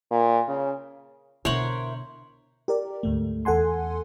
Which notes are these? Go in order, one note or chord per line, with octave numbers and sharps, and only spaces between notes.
A#2
C#3
B2 D3 E4 A#4 C5 C#5 F#5
G4 A#4 D5
D2 G#2 A3
E2 A4 F#5 G#5 C6